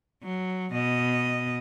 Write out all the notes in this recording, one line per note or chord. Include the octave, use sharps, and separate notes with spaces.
F#3
B2 D#5